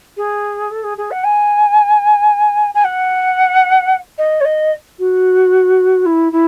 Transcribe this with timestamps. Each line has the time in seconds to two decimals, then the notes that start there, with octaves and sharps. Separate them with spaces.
0.17 G#4
0.70 A4
0.83 G#4
0.97 G#4
1.11 F#5
1.24 G#5
2.74 G#5
2.84 F#5
4.18 D#5
4.40 C#5
4.45 D#5
4.98 F#4
6.05 E4
6.32 E4